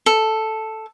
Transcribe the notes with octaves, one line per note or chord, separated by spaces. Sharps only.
A4